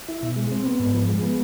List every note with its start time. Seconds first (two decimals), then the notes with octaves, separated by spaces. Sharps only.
0.09 E4
0.23 B2
0.36 G#3
0.52 C4
0.65 B3
0.79 G#2
0.94 F3
1.08 G#3
1.22 B3